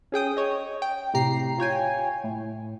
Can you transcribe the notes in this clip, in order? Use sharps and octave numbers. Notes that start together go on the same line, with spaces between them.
C#4 G#4 G5 D#6
C#5 D#5
G5
A2 C3 G4 A#5 C7
F4 C#5 G5 G#5
A2